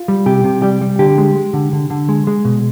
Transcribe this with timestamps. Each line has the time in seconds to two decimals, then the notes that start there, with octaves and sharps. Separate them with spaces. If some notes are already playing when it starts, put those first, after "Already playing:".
Already playing: F4
0.08 G3
0.26 C3 G4
0.44 C3
0.62 G3 G4
0.81 G3
0.99 D3 G4
1.18 G#3
1.36 G#3
1.53 D3
1.73 D3
1.90 D3
2.09 G#3
2.27 G#3
2.45 B2